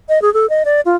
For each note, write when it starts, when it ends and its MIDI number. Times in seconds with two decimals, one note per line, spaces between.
0.09 0.21 75
0.22 0.32 68
0.34 0.49 69
0.49 0.63 75
0.65 0.81 74
0.85 0.96 65